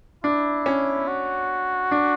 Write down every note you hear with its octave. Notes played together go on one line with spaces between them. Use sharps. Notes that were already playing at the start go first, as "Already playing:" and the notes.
D4 E4
C#4
F#4
D4